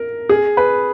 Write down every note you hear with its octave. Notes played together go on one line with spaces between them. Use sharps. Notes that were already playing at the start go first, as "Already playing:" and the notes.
Already playing: A#4
G#4
B4